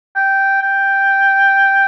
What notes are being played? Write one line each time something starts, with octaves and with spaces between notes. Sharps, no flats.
G5
G5